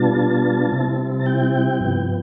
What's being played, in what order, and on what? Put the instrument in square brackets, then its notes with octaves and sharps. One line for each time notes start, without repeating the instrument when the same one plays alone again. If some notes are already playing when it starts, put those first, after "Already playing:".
Already playing: [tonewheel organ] B2 G3 B3 D4 F4 A5
C3 G3 C4 E4
A5
G5
G2 F3 B3